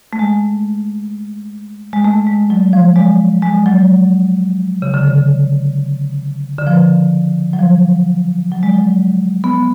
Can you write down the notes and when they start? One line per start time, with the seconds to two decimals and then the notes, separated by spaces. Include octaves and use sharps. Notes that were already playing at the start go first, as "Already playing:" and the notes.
0.13 A3
0.19 G#3
1.93 G#3
2.05 A3
2.27 G#3
2.50 F#3
2.73 F3
2.96 G#3
3.42 G#3
3.66 F#3
4.82 C#3
4.94 D3
5.07 C#3
6.58 D3
6.67 F3
7.53 F#3
7.59 F3
8.52 F#3
8.63 G#3
8.74 F#3
9.44 B3